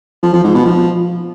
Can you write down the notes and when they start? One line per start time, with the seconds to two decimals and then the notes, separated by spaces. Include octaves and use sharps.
0.23 F3
0.33 F3
0.44 G#2
0.55 B2
0.65 F3